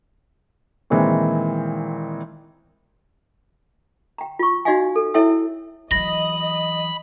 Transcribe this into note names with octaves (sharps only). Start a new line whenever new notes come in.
A#2 D#3 E3 G#3 C4
G5 A#5
F4 C#6
D#4 F#4 D5 D#5 F5 G#5
A4
E4 A4 C#5 E5 G5 E6
E3 F#3 D#5 B5 A#6